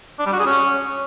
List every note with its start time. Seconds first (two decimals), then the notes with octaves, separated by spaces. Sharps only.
0.19 D4
0.26 G3
0.33 F#4
0.40 G#4
0.46 C#4